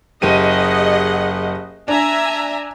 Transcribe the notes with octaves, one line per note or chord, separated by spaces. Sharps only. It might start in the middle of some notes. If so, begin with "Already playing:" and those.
F#1 G4 G#4 D#5 F#5 D#7
D4 E5 G#5 A#5